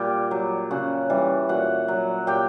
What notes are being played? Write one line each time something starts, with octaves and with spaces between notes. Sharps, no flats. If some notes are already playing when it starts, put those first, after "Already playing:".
Already playing: A#2 G3 G4 G5
F#3
C#3 F#4 F#5
E3 G3
A#2 F#4 F#5
F#3
A#2 G4 G5